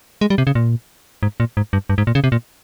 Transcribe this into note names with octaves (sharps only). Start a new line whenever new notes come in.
G#3
G3
C3
C#3
A#2
G#2
A#2
G#2
G2
G2
G#2
A#2
C#3
C3
A#2